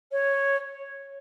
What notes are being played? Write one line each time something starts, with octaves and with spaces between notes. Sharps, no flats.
C#5